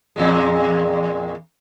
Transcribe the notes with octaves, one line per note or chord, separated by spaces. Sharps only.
E2 A#2 G#3